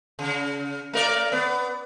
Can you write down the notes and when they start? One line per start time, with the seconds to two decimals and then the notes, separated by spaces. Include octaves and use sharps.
0.19 C#3
0.93 A3 A#4 D5
1.32 B3